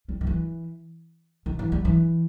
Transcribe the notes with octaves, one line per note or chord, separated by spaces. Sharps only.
G3
D#3
E3
D#3
E3
G3
E3